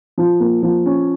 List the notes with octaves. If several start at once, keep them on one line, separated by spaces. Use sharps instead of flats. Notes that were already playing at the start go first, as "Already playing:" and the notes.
F3
A#3
F3
C#4